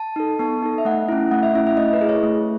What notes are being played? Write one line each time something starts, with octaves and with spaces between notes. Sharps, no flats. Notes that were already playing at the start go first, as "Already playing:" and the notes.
Already playing: A5
D#4 A4
B3 A5
D#4 A4
E5
A3 F#5
C#4 E4
A3 F#5
E5
C#4 E4 E5
E5
A3 D#5
B4
E4 G#4
C#5
A3